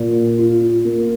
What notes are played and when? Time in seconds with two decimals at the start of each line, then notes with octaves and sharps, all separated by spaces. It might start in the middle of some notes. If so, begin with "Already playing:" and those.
Already playing: A#2
0.39 F4
0.85 A#3